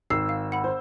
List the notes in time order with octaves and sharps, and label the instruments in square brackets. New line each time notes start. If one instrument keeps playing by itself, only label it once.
[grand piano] G#1 [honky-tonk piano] E6 [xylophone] C7
[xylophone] F5
F#5 B5
[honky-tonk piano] C5